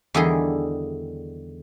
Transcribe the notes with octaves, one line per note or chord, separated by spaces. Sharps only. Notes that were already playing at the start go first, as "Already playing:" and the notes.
E2 D3 D#3 G3 G#4 C6